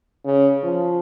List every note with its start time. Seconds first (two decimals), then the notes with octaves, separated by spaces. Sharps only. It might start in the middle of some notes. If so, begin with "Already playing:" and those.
0.25 C#3
0.63 F3